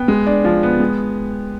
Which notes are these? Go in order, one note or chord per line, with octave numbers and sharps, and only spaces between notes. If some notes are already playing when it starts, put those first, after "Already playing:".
Already playing: B3 G5
G#3
D4
F3
B3
G#3